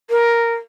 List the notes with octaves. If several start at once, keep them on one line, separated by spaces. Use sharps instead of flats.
A#4